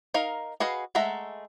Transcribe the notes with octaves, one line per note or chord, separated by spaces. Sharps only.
D#4 A#4 F5
F#4 G#4 B4 D#5 F5
G#3 A3 E5 F#5 A#5